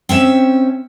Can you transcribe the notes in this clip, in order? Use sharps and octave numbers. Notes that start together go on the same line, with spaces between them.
C4 C#4 E5